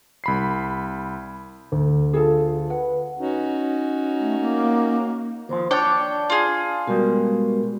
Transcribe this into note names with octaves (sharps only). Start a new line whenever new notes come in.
C2 B5 C7
D2
F4 G#4 A4 A5
B4 F#5
C#4 D#4 F#4
A3
A#3
D#2 F3 C5
D4 C#5 D5 G5 A5
F4 G#4
B2 G3 G#3 F#4 A#4